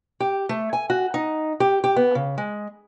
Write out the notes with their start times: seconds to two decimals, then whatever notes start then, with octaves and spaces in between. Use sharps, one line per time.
0.20 G4
0.49 A3
0.73 G#5
0.90 F#4
1.14 D#4
1.60 G4
1.84 G4
1.96 B3
2.15 C#3
2.38 G#3